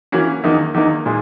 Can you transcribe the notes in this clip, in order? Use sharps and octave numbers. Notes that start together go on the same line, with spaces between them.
E3 A#3 C#4 F#4
E2 D#3 A#3 D#4
E2 D#3 A#3 D#4
A#2 G#3